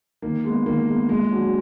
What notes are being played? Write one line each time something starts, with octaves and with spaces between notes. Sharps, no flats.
D#3 A#3
G#3 B3
D#3 A#3
G#3 B3
A#2 G#3
F#3 D4 F#4